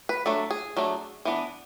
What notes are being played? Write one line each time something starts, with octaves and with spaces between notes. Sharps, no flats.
B4
F#3 A3 D4 A4
G#4
F#3 A3 D4
E3 B3 D4